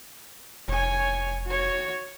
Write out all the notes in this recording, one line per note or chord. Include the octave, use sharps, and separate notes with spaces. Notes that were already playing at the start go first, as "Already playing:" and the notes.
F1 C#5 G#5
F#4 C#5